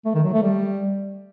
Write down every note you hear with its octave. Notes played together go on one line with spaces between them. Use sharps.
A3
D#3
F#3
A3
G3